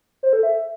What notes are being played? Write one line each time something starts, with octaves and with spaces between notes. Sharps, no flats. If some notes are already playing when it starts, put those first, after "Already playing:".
C5
A4
E5